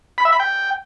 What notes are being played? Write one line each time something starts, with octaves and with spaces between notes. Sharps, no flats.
B5
E5
B5
G5